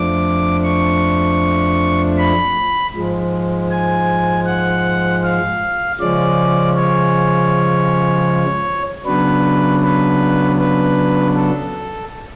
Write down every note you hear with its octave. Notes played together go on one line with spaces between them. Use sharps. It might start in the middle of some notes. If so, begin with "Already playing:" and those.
Already playing: F2 F3 A3 D4 D6
C#6
B5
G#2 F3 G#3
G#5
F#5
F5
C#3 F3 G#3 C#4 D5
C#5
C#3 F#3 B3 D4 B4
B4
B4
A4